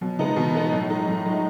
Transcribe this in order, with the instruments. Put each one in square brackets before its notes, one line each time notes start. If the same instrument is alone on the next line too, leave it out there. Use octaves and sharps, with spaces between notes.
[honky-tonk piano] B2 [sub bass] F#3
[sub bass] C#3 [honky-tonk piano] G#3 B3 D#4
[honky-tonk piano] B2 [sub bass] E3
[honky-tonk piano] G#3 B3 D#4
[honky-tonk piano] A2 [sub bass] F#3
[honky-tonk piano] G#3 D#4
[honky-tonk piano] A2 [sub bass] F#3
[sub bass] F#3 [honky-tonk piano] G#3 D#4